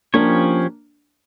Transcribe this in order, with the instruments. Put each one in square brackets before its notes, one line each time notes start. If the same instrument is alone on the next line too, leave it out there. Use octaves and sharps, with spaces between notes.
[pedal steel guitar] F3 C#4 G4 C#5 [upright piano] A#3 D4